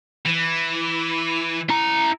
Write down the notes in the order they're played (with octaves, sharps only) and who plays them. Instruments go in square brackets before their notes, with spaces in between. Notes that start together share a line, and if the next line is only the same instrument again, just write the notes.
[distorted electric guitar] E3
[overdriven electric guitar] E4 A#5